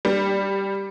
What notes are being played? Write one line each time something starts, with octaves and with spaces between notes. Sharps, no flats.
G3